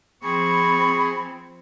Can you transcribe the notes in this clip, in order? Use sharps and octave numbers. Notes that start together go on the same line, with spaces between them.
F3 C4 G#4 B5 C#6